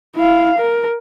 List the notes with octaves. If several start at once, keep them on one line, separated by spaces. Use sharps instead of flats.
E4 F5
A#4